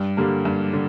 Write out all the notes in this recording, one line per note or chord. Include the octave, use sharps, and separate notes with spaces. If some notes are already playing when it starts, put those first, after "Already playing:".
Already playing: G2
D3 G3 A#3
G2
D3